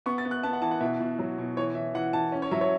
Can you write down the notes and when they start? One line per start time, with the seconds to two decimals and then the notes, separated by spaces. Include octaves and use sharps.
0.06 B3 C#6
0.18 A6
0.25 B3
0.31 F#6
0.43 B3 A5
0.53 F#5
0.62 E3 A5
0.71 F#5
0.81 B2 E5
1.00 B2
1.19 F#3
1.38 B2
1.57 E3 C#5
1.75 E3 E5
1.94 E3 F#5
2.13 E3 A5
2.32 C#4
2.42 C#5
2.51 F#3 E5
2.61 C#5